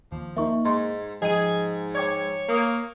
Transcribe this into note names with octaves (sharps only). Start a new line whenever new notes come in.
D#2 F3
A#3 D#4 E5 C#6
G#2 D#5 C6
G#2 F3 G#4 D#5 G5 D#7
C#5 G5 D6 G#6
A#3 A#4 D#6